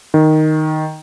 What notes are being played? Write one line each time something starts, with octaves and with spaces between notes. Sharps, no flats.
D#3